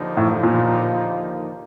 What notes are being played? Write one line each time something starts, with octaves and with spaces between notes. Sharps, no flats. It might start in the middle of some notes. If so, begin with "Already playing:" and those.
Already playing: D#2 D3 F3 A#3 D#4
A2
A#2